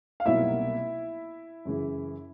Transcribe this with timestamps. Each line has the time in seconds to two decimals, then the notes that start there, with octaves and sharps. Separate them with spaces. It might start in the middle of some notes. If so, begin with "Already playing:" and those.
0.20 F5
0.26 C2 B2 F#3 A#3 D#4 E4 E5
1.65 F#2 C#3 E3